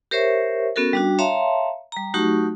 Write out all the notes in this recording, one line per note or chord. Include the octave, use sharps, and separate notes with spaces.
G4 A#4 C5 C#5 E5 C#6
B3 C#4 F#4 A4 A#4
G3 D4 F#4
C#5 E5 F5 A5 A#5 C6
G3 A#5
F#3 A3 D#4 F#4 G4 C#6